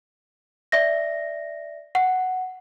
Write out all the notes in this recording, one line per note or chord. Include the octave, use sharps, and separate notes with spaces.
D5 E5 A#6
F#5